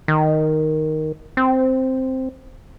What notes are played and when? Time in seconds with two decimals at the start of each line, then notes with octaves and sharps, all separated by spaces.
0.08 D#3
1.37 C4